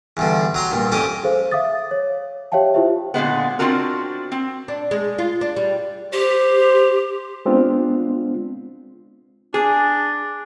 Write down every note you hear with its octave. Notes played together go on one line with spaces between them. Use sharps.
E2 G2 D3
F#3 A#5 C6
G2 A#2
F2 C#4 G4 D#5
G#4 A4 C5 F5
E5 F5 D6 D#6 A6
C#5
G4 C#5 E5 F5 G5 A5
E4 F4 G4 C5 E5
A#2 D3 G#3 B3
C4 D4 F4 F#4 A#4
C4
D4
G#3
F4
D4
G3
G4 C5
G#3 B3 C4 D4 F4
D4 G#4